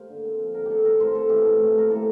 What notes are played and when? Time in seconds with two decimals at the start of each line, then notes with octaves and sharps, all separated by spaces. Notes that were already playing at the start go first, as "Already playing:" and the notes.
Already playing: A#3 G4 C5
0.10 D3
0.25 C4
0.39 F3
0.54 D3 A#4
0.66 D3 G4 A4
0.85 C4 A#4
1.00 A2 C5
1.15 A#3 A4
1.29 E3 G4
1.45 A2 A4
1.60 A2
1.75 A#3 A#4
1.90 A2 A4